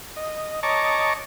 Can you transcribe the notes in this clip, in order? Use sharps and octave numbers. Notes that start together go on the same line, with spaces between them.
D#5
C#5 D#5 A5 A#5 C#6 D6